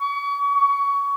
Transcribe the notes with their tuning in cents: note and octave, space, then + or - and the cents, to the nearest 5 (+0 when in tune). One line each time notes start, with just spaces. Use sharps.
C#6 +35
C#6 +20